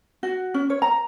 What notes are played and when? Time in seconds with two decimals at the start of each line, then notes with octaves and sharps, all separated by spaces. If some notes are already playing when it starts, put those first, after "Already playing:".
0.23 F#4
0.54 C#4
0.70 C#5
0.82 A#5